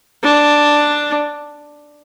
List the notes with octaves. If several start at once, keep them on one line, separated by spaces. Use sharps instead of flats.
D4